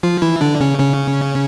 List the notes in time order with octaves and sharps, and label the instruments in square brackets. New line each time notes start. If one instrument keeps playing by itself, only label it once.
[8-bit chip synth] F3 F4
E3 E4
D3 D4
C#3 C#4
C#3 C#4